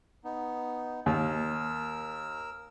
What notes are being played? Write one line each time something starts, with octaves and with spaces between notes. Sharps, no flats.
B3 D#4
D#2 A#4 E6